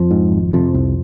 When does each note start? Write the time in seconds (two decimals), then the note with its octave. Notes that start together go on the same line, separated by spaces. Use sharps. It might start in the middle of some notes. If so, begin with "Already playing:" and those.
Already playing: F2 F3
0.11 G#2
0.32 G#1
0.53 F2 C3 F3
0.74 C2